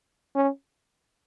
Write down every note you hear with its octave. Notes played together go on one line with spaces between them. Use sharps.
C#4